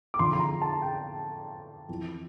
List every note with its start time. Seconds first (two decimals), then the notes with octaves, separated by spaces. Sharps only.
0.14 D6
0.19 F2 D3 F3 C6
0.33 C6
0.39 A#5
0.62 A5
0.82 G5
1.89 F2 E3